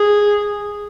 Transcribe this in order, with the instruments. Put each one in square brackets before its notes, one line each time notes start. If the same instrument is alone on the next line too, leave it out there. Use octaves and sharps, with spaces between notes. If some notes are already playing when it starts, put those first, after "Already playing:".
Already playing: [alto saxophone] G#4